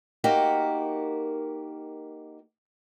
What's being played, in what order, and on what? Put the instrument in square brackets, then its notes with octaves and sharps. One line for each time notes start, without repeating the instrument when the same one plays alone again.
[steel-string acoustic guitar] A#3 D#4 F#4 G4 A#4